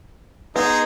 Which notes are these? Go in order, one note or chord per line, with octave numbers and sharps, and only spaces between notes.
B3 D#4 G#4 A#5 C6